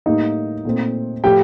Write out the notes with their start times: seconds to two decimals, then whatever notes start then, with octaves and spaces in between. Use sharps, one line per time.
0.06 A2 G3 A#3 D#4 D#5
0.65 A#2 A3 C4
1.24 A2 F3 A3 G4 G5